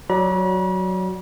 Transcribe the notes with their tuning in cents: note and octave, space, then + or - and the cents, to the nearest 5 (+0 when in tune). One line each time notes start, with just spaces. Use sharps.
F#3 +0 D5 +0 B5 -45